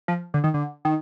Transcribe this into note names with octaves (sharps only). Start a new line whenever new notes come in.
F3
D3
D#3
D3
D#3